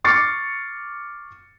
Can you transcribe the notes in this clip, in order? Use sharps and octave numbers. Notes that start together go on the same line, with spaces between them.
C#6 D6 F6 A6 C7 C#7